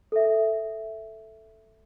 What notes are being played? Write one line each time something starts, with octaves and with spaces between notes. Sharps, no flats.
A4 E5